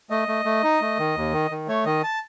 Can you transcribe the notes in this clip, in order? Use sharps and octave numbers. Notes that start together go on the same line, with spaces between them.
A3 D#5
A3
A3
D#4
A3
D#3
D#2
D#3
D#3
A3 C#5
D#3 D#5
A5